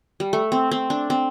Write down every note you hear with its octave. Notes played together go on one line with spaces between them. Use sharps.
G3
A3
C4
C4
D4
C4